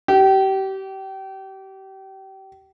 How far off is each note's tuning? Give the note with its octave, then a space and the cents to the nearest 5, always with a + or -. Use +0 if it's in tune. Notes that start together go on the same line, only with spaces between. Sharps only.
G4 -30